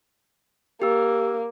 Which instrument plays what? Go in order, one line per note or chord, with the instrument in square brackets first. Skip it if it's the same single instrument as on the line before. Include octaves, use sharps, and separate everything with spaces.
[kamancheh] A#3 [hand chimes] G4 E6